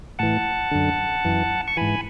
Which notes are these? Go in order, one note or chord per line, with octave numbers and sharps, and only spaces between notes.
A2 E3 F#5 A5
F#2 D3
F#2 E3
C#6
G#2 E3 G#5 B5